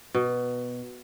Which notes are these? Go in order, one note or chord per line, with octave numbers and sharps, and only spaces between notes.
B2